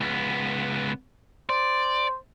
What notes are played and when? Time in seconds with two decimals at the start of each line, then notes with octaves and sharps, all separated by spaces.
0.01 C#2 B3
1.50 C5 D5